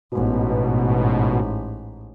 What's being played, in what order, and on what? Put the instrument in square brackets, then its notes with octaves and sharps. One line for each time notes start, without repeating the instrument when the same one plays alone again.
[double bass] A1 G#2 [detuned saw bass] B2